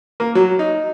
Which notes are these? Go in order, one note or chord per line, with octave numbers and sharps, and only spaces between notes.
A#3
F#3
D#4